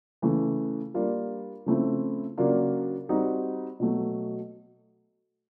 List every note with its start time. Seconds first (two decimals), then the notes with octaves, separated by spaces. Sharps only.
0.22 C#3 E3 A3
0.94 G3 A#3 D4 F4
1.66 C#3 F3 A3 C4 E4
2.38 C#3 F#3 A#3 D4 F4
3.09 G3 C4 D#4 F#4
3.80 B2 F#3 A3